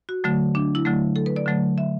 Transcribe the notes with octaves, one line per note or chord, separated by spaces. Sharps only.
F#4
D3 F#3 A3
D4
E4
D3 F#3 A3
A4
B4
D5
D3 F#3 A3
E5